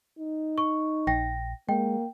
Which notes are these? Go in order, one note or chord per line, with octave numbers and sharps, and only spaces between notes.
D#4
C#6
A#1 G5 A#6
G#3 A#3 G5